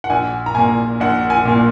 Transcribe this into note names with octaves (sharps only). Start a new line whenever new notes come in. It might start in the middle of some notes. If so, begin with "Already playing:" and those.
F#5
A#1 G#5
A#5
A#2 A#3 G#5
A#1 F#5
G#5
A#2 A#3